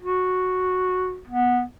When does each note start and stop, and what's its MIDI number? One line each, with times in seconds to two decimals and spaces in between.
0.01 1.19 66
1.27 1.62 59